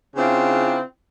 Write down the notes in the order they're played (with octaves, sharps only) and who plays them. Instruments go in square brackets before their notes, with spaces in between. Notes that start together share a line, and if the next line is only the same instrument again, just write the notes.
[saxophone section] C#3 C4 D4 E4 F4